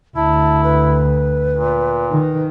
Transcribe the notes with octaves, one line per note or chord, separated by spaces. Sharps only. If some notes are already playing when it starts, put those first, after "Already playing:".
D2 E4 A5
B4
A#2
D#3